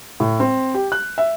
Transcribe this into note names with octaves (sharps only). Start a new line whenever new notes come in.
A2
C4
G4
F#6
E5